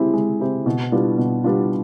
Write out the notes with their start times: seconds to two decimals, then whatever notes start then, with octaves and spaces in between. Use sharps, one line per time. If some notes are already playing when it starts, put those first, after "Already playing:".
Already playing: G#3 C4 E4 G4
0.13 G#3
0.40 C4 E4 G4
0.66 B2
0.92 G3 B3 D4 F4
1.18 B2
1.44 G3 B3 D4 F4